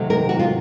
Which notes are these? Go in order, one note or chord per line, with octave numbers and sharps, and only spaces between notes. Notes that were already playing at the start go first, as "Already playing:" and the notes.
Already playing: C3 D#3 F#3 A3 C4
A#4
F#4
F4